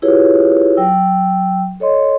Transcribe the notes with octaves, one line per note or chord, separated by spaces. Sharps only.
E4 F4 G4 G#4 B4 C#5
F#3 G5 E6
A4 C#5 D#5 C6